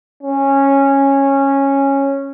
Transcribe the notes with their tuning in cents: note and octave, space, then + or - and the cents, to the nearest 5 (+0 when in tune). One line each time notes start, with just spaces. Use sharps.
C#4 -10